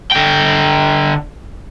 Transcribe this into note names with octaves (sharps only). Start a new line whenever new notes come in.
D3 G5